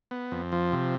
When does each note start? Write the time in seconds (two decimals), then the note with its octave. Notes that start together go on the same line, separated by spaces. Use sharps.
0.11 B3
0.31 F2
0.52 F3
0.72 C3